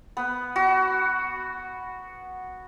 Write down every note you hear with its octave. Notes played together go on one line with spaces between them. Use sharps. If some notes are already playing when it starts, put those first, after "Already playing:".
B3
F#4